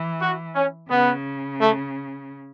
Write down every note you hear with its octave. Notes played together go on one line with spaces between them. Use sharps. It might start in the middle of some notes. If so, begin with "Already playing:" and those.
Already playing: E3
F#4
C#4
C#3 B3
A3